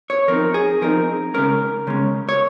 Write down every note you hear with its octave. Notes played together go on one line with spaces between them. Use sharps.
C#5
F3 C4 D#4 A#4
G#4
F3 C4 D#4 A#4
C#3 G#3 C#4 A#4
C#3 G#3 C#4
C#5